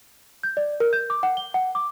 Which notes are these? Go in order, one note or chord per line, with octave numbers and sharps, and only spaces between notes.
G6
D5
A#4
G6
D6
F#5
G7
F#5
D6